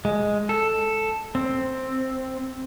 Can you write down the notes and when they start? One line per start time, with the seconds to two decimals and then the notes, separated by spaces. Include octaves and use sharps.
0.05 G#3
0.49 A4
1.35 C4